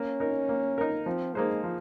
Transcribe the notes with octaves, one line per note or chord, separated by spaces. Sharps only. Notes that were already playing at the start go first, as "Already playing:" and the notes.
Already playing: A#3 C#4
D#4 A#4
A#3
D#4 A#4
F3 C4
G#3 A#3 D#4 G#4 C5
F3